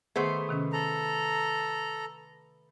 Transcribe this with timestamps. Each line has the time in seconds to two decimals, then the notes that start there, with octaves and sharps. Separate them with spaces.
0.16 D#3 A3 B3 G#4 C5
0.49 C3 D#3 C#4
0.73 A4 A#5